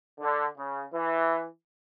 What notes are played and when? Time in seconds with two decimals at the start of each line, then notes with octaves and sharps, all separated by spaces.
0.20 D3
0.57 C#3
0.94 E3